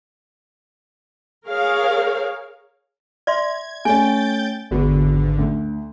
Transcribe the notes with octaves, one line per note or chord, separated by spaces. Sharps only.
G#4 A#4 C#5 F5
D5 E5 C6 G#6
A3 C#4 G5 G#5 G6 A6
G#1 E2 D3 B3 F#4
D2